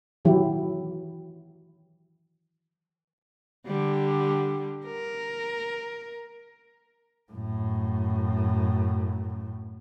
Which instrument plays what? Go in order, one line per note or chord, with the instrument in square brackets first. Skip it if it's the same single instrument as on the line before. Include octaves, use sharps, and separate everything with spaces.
[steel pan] D#3 E3 F#3 E4 G4
[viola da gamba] D3 G3
A#4
[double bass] F#2 A2